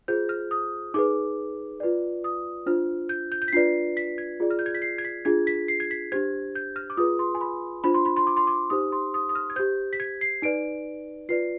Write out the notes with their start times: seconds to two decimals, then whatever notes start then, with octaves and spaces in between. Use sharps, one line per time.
0.08 F4 G#4 C5 G6
0.29 F6
0.51 D#6
0.94 D#4 G#4 B4 D6
1.80 F4 B4 D5
2.24 D#6
2.66 D4 F4 C5 F6
3.09 G6
3.32 G6
3.42 G6
3.48 B6
3.52 D4 F4 B4 D5 C7
3.97 B6
4.18 G#6
4.40 F4 G#4 D5
4.51 F6
4.59 G6
4.66 G#6
4.75 B6
4.82 C7
4.98 G#6
5.05 B6
5.25 D4 F4 G#4 G#6
5.47 B6
5.68 C7
5.80 G#6
5.91 B6
6.12 D4 G4 C5 G#6
6.55 G6
6.76 F6
6.90 D6
6.97 F4 G#4 B4 D#6
7.19 C6
7.35 G#5
7.41 B5
7.84 D4 F4 C5 B5
7.94 C6
8.05 B5
8.16 C6
8.27 D6
8.37 C6
8.47 D6
8.70 D#4 G4 C5 D#6
8.92 C6
9.14 D#6
9.29 D#6
9.35 F6
9.50 G#6
9.56 G4 C5 G6
9.93 B6
10.00 G#6
10.21 C7
10.42 D#4 B4 D5 D7
11.29 F4 B4 D5 C7